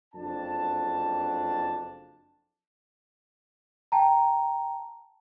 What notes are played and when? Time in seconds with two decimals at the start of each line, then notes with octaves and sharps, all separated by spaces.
0.14 F#1 F2 D4 A5
3.92 G5 A5 A#5